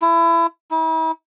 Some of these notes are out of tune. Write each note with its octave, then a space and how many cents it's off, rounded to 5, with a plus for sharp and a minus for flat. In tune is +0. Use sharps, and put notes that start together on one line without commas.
E4 +25
E4 -45